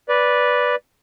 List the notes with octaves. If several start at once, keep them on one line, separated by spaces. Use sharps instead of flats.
B4 D5